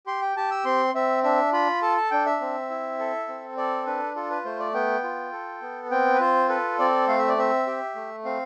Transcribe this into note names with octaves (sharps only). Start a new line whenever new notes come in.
G4 C6
G5
G4 A5
E6
C4 C6
C4 E5
D4 E5
F4 B5
A4 A5
A5
D4 G5
E5
C4
E4
A4
C4
A4 D5
D4 B4
F4 A4
B4
A3 C5
D5
B3 G5
F4
A4
B3
C4 G5
B4
F4 C5
A4 B4
C4 D5
A3 F5
E5
D5
C4 E5
G4
A3
C4 F5